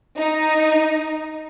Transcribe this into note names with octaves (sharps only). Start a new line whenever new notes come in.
D#4